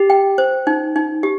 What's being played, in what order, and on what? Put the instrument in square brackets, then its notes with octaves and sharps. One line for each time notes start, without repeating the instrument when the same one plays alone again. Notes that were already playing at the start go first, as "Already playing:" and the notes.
Already playing: [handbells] G4
[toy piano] G5
C5
D#4
D#4
G4